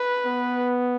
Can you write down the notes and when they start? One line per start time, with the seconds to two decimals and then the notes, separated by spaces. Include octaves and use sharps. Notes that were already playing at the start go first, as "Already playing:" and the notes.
Already playing: B4
0.26 B3